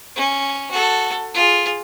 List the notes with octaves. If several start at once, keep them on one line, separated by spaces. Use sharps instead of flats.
C#4
F#4 A4
F4 G#4